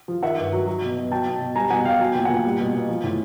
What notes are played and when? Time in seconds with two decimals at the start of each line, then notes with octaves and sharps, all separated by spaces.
0.08 F3
0.23 D#3 E5 F#5
0.38 G2
0.52 F#3
0.67 F#3
0.82 B2
0.97 B2
1.11 F#3 G5 A5
1.26 B2
1.41 B2
1.56 G3 G#5 A#5
1.70 B2 F#5 G#5
1.85 B2 F5 G5
2.00 F#3 G#5
2.13 A#2 G5
2.25 A#2 F#5 G#5
2.45 G3
2.59 B2
2.74 B2
2.89 F3
3.04 A2